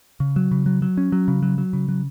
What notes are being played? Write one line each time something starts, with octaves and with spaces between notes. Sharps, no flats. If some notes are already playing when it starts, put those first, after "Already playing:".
C#3
F#3
C#3
F#3
F#3
C#4
F#3
C#3
F#3
F#3
C#3
F#3